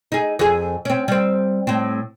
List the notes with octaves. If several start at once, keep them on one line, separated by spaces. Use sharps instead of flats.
D#4 G#4
F2 G#4
C4 C#4
G3 C4
A2 C4